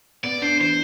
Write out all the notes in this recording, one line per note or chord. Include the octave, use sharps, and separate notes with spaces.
B3 D5
D4 C5
E3 C5